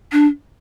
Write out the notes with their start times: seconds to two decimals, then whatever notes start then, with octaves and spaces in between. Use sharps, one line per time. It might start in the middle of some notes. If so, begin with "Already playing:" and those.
0.12 D4